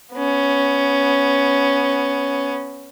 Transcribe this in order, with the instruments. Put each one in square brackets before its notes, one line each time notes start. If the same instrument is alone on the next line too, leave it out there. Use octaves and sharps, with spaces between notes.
[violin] B3 C#4